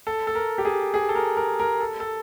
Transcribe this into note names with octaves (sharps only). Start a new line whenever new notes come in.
A4
A4
A#4
G4
G#4
G#4
A4
A#4
A#4
A#4
A4
A4